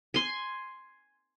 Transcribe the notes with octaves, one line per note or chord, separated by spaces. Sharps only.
G#5 C6